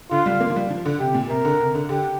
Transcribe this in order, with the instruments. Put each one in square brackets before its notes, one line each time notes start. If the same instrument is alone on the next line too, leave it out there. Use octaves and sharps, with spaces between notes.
[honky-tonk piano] D3 [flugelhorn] F4
[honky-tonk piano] G3
A#3
F3
G3
F3
D3
[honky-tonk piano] C3 [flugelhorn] G4
[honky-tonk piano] A#2
[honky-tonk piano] C3 [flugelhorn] A#4
[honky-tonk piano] D3
C3
D3
[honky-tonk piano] D3 [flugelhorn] G4